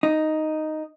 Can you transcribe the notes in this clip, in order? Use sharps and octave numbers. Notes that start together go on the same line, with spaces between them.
D#4